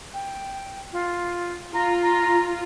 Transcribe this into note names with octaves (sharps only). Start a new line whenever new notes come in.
G5
F4
F4 A#5
A#5